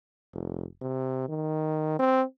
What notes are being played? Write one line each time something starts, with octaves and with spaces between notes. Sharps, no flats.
F1
C3
D#3
C4